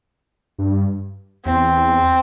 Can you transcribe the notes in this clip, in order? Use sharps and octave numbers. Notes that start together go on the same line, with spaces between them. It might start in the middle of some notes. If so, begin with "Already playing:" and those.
G2
E2 C4